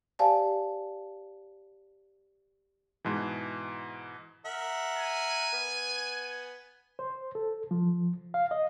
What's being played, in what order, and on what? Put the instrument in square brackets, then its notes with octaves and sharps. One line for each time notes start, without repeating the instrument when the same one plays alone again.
[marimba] G4 C5 D5 F5 G#5 A5
[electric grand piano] G#2 B2 E3
[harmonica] A#4 E5 F#5
[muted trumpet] G#5
[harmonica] B3
[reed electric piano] C5
A4
F3
F5
D#5